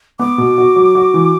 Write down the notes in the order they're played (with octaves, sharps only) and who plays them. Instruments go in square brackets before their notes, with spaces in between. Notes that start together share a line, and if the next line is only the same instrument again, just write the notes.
[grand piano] B3 [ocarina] D6
[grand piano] B2
F#4
F#3
F#4
E3